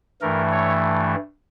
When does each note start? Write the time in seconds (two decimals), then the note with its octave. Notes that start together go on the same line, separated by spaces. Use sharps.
0.22 G2 E3 A3 A#4
0.52 C#5